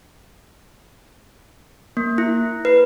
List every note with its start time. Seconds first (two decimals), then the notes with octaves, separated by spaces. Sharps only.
1.97 A#3
2.18 E4
2.65 B4